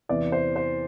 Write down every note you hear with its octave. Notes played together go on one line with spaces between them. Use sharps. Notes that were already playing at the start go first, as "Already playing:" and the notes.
E2 C3 E3 D5
C5
C5